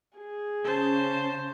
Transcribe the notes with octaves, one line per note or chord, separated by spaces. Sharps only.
G#4
C#3 C#4 C5 A5